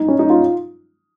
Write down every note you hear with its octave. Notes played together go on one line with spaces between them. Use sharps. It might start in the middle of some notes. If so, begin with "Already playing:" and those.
Already playing: D#4
C#4
D#4
F4